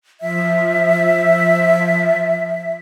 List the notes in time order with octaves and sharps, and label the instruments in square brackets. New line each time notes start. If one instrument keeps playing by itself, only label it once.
[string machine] F3 [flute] E5